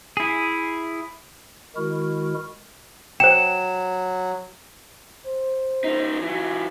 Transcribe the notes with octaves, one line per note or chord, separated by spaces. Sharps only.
E4 G#4
D#3 G#3 E4 F#4 A#4
F#3 C5 G5 E7
C5
C#2 D#4
E3 F#3